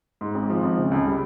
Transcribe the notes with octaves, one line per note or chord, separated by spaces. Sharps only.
G#2
G#1
F3
G#1
C#3
C#2
G3